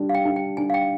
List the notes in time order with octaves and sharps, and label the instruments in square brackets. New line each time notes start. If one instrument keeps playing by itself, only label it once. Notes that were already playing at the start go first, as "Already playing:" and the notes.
Already playing: [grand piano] G3 D4
[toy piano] F5
G5
[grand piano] D4
[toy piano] G5
[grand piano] D4 [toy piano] G#5
[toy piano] F5
G5